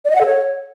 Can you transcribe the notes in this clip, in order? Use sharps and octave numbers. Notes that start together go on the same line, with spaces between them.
D5
D#5
F#5
A4
C#5